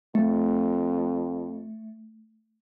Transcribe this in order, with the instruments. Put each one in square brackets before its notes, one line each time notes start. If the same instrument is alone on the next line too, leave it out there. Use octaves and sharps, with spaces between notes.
[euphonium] F2 [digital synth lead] A3